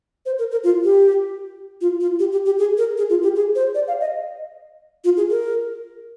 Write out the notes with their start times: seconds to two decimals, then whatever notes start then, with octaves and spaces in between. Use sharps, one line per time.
0.26 C5
0.39 A#4
0.51 A#4
0.64 F4
0.84 G4
1.81 F4
2.00 F4
2.19 G4
2.32 G4
2.46 G4
2.59 G#4
2.78 A#4
2.98 G#4
3.10 F4
3.23 G4
3.36 G#4
3.55 C5
3.75 D5
3.88 F5
4.01 D#5
5.04 F4
5.17 G#4
5.30 A#4